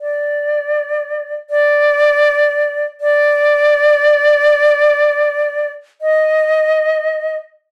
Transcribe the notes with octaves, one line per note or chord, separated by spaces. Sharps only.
D5
D5
D5
D#5